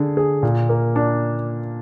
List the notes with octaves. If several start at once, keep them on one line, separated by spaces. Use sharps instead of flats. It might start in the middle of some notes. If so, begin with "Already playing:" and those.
Already playing: D3 G#4
G#4
A#2
A#3
D4